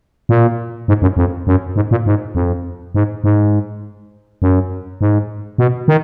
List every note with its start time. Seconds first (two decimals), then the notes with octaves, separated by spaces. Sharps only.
0.29 A#2
0.88 G#2
1.02 F#2
1.17 F2
1.47 F#2
1.76 G#2
1.91 A#2
2.06 G#2
2.35 F2
2.95 G#2
3.24 G#2
4.42 F#2
5.01 G#2
5.58 B2
5.88 D#3